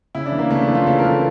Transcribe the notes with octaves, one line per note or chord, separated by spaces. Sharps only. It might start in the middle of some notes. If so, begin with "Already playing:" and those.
C#3 E4
D4
E3
A#3
C#3 A3
D4
E3
F4
C#3 A4
A#4
E3
A4